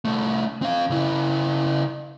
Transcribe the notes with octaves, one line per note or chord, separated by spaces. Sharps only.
C2 A3
C4 F5
C#3 E4